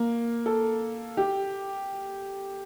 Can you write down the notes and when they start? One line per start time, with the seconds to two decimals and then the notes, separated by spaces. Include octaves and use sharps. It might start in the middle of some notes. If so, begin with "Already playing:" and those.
Already playing: A#3
0.46 A4
1.17 G4